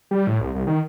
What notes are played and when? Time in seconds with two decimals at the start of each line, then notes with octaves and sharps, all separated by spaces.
0.11 G3
0.27 A2
0.40 C2
0.55 C2
0.67 D#3